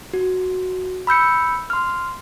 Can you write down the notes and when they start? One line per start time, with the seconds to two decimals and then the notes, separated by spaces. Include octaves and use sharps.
0.13 F#4
1.07 B5 E6 G6 C#7
1.70 C6 F6